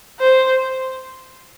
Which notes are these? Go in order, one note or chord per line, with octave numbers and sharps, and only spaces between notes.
C5